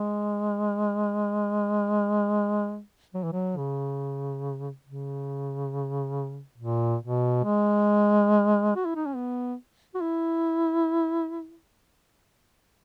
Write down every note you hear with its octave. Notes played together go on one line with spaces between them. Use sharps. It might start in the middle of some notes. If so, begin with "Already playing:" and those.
Already playing: G#3
F#3
E3
F#3
C#3
C#3
A#2
B2
G#3
F#4
E4
D#4
C#4
B3
F#4
E4